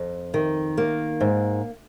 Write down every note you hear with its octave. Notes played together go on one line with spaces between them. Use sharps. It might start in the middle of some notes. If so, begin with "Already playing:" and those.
Already playing: F2
D#3
A#3
G#2